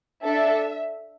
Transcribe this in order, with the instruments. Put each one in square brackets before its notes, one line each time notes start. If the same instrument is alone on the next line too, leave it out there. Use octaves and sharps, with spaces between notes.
[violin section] D4 A4 E5